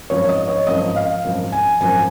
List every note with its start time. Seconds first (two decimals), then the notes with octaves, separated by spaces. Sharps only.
0.10 G#1 F#2 F3 C#5
0.29 D#5
0.48 C#5
0.67 G#1 F#2 F3 D#5
0.96 F5
1.25 G#1 F#2 F3
1.52 G#5
1.81 G#1 F#2 F3 G#5